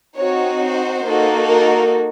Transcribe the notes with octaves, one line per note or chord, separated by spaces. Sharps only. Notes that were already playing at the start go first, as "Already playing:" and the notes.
C4 D#4 F#4 C#5
C5
A#3 D#4 F#4 A4
A#4